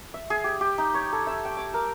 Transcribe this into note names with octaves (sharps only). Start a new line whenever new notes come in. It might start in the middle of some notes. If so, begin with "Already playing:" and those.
E5
G#4
G4
G4
D#4
C#5
A4
E5
G5
D6
A#4